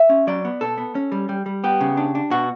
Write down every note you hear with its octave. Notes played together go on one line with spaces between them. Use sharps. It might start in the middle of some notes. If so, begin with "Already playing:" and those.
Already playing: E5
C#4
F#3 D5
B3
B2 A4
B3
C#4
G3
G3
G3
B3 G4
C#3
D4
D4
B2 F#4